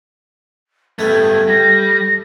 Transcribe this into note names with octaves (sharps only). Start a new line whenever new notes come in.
G3 A3 B3 G#6
G3 A#6